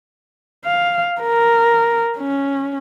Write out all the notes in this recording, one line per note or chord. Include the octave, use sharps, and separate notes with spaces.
F5
A#4
C#4